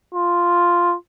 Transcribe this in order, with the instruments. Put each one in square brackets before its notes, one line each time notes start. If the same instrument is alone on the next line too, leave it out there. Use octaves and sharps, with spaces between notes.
[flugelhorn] F4